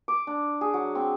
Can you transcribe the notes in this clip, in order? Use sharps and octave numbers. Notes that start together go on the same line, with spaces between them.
D6
D4
G#4
F#3
C4